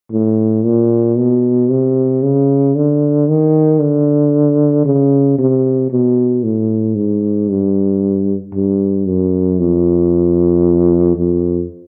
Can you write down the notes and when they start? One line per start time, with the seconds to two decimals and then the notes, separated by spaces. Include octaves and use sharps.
0.12 A2
0.65 A#2
1.18 B2
1.70 C3
2.23 C#3
2.75 D3
3.28 D#3
3.80 D3
4.85 C#3
5.39 C3
5.91 B2
6.43 A2
6.95 G#2
7.49 G2
8.54 G2
9.06 F#2
9.59 F2
11.16 F2